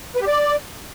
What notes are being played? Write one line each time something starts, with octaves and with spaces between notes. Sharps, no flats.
B4
G4
D5